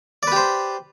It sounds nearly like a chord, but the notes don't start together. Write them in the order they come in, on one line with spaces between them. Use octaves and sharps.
D5 B4 G4 C5